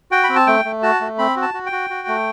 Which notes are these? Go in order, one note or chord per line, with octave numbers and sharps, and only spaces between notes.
F#4 G5
B5
C4
A5
A3 G5
A3
F#4 A5
A3
C4 B5
F#4
A5
F#4
G5
F#4
F#4
A3